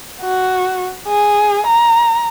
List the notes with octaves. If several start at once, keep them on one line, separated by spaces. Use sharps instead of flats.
F#4
G#4
A#5